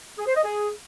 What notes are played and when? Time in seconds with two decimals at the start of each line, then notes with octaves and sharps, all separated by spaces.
0.18 G#4
0.27 C5
0.36 D#5
0.45 G#4